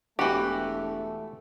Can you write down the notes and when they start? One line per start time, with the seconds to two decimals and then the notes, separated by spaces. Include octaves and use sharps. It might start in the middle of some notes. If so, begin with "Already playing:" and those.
0.19 E1 E3 A3 F#4 G4 F#5 G5